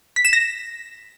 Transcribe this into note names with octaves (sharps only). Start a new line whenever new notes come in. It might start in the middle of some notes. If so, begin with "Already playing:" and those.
B6
E7
A#6